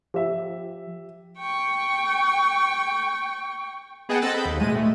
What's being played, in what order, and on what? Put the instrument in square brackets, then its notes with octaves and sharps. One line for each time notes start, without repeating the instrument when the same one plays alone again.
[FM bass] F3 [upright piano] G4 E5
[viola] G5 C#6
[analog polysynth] B3 G#4 D#5 F#5 G5 A5
C4 A4 D#5 E6 F#6 A6
B5 G6
D#2
B1 A2 G#3 D#7
A3